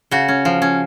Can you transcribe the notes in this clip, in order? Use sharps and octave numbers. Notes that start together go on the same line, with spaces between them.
C#3 F#4
C#4
F3
C#4